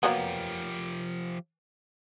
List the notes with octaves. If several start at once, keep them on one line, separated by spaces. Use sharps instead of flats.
F3 F#3 A#3 B3 G4